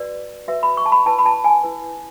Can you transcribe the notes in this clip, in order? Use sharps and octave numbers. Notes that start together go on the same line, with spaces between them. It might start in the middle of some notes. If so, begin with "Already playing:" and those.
Already playing: F#4 B4 D5
F#4 B4 E5
B5
C#6
A5
B5
E4 B4 A5
B5
A5
G#5
E4 B4